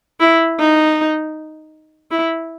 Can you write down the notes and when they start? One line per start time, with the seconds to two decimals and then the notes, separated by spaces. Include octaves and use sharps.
0.20 E4
0.60 D#4
2.11 E4